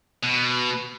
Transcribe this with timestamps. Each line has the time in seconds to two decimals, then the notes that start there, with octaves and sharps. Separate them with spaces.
0.24 B2